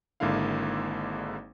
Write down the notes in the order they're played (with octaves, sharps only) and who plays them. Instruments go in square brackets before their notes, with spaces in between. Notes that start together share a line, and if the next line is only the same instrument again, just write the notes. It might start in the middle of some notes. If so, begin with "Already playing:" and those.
[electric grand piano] G#1 G#2 D3 A#3 E4 F5